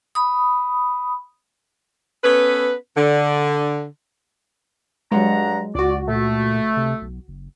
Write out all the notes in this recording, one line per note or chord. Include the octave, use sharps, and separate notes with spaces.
B5 D#6
B3 C#4 A4 B4
D3
G2 F#3 G#3 F#5 A#5
C#2 F#4 D5
A#2 A3
C3
B1
F#1